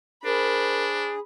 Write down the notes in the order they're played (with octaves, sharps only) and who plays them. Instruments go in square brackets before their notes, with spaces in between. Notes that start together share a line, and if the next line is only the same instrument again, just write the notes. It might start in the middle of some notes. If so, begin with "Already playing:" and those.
[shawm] D4 [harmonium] G#4 [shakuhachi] A#4 [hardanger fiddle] C5 B5